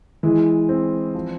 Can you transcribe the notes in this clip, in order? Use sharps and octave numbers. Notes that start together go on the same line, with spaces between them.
E3 G#3
C4
F3